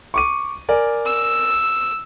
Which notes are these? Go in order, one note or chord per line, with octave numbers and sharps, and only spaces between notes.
C#6 D6 D#7
A#4 D5 G#5
E6